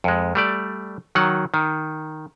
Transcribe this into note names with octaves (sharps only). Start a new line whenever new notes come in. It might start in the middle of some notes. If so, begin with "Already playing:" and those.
F2 G#3
G3 A3 D5
D#3 F#3 F#5
D#3